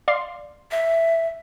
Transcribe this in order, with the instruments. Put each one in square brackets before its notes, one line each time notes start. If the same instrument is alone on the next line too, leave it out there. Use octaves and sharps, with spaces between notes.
[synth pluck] D5 F5 C6
[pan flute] E5